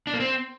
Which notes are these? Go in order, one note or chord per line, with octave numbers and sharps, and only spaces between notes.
D4
A#3
C4